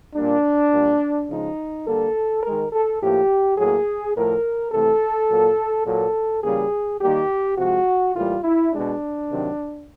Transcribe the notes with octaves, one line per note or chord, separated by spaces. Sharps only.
A#2 G3 A#3 D4
A#2 G3 A#3
C#3 F3 G#3 D#4
D3 G3 A#3 A4
D#3 G#3 A#4
A4
A2 F3 A#3 G4
A2 F#3 A#3 G#4
A2 F3 A3 A#4
C3 E3 A3 A4
A#2 F#3 A#3
A#2 F#3 A#3 A4
C#3 E3 G3 A#3 G#4
D#3 G3 A#3 G4
C3 F3 G#3 F#4
A2 E3 G3 A#3 F4
E4
G#3 D4
B2
C3 D#3 F#3